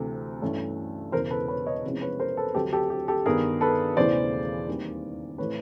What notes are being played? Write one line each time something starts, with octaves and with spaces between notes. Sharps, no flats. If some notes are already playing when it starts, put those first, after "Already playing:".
Already playing: D2 C3 E3
G2 E3 A3 C#4
E1 E2 C#3 A#4 C5
A4 B4
B4 C#5
C#5 D#5
E2 C3 F3 G#3 C#4
B4 C#5
A#4 C5
A4 B4
D2 D3 F#3 A3 C4 G4 A4
G4 A4
G4
G4 A4
G2 D#3 G3 B3 G#4 A#4
A4 B4
E1 E2 C#3 E3 A3 C5 D5
D#2 D#3 G3 C4
A2 E3 A3 C4 B4 C#5